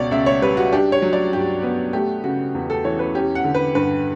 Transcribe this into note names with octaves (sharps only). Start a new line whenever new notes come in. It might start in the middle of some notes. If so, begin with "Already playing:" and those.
Already playing: C#2 B2 C#5 D5
C#2 E5
C#5
G3 B4
F#4
D4 G4
C#5
F#3
D5
G2 G4
B3
A3 G4
C#3 F#4
E2
A4
E3 C#5
B4
C#4 G4
F#5
D3
B4
G2 B4